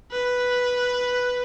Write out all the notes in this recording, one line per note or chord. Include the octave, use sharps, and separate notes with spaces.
B4